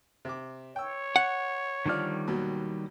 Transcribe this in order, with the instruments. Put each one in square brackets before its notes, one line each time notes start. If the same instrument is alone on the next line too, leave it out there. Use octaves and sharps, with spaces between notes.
[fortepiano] C3 D6
[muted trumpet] C#5 [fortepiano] G5 E6
[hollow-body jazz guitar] F#5
[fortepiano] D3 F3 D5 [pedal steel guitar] D#3 G3 F6
[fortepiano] D#2 B2 F#3